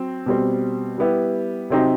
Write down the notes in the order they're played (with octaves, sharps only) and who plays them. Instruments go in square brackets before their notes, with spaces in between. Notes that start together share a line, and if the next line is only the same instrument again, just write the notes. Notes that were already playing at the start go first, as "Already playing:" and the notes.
Already playing: [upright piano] F#3 C4
B2 G3 C4
G3 B3 E4 G4
C3 F#3 C4 D#4 G4